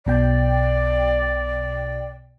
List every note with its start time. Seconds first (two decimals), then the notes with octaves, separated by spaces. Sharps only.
0.06 B1 B2 D5 G5